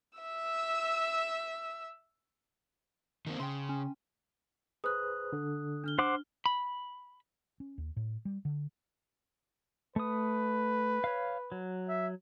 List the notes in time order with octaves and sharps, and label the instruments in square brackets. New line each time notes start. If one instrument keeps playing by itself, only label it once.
[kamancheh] E5 E6
[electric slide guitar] D#3 A#3 C4
[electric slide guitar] C#3 [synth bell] G5 C6
[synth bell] C#4
[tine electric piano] G#4 B4 C5 [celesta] D#6 F#6
[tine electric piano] D3
[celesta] D4 F6 G7
[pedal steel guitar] C5 F#5 D6
[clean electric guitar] B5
[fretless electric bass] C#4
D#2
A2
G3
D3
[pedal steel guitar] A3 D#6 [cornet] B4
[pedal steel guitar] C#5 F5
F#3
[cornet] E5